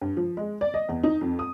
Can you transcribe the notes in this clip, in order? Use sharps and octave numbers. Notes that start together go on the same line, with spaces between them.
G2
F3
G#3
D5
D#5
E2
D#4
F2
D#6